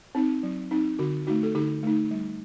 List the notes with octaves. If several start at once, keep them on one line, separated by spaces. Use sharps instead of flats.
C4 D#4
F#3
C4 D#4
D3 F#4
A3 D#4 F#4
A4
D3 D#4 G4
A3 D#4
G3